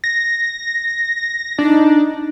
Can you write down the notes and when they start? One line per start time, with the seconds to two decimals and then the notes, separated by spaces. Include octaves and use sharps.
0.04 A#6
1.59 D4 D#4